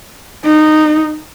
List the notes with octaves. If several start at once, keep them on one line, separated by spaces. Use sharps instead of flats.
D#4